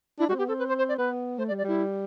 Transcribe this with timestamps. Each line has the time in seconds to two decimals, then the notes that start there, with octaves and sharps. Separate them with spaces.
0.19 D4 E4
0.29 G3 F#4
0.34 C4
0.39 B3 G4
0.48 C4 A4
0.59 B4
0.68 C5
0.78 C5
0.89 D5
0.98 B3 B4
1.38 A3 C5
1.48 D5
1.51 G3
1.58 D5
1.64 G3 E4